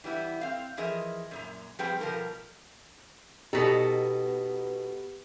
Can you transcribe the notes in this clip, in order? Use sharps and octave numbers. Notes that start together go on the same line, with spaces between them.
E3 G3 B3 E4
C4 F5
E3 F3 G#4 A#4 D#5 E5
F#2 A#2 A#5
F3 G3 C4 G#4 B4 G5
B2 F3 G3 A#4 A#5
B2 B3 D#4 G4 A4